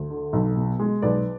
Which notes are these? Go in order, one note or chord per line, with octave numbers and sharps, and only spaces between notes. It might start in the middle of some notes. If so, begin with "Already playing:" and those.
Already playing: D2
D3
B1
B2
G#3
B1 B4 D5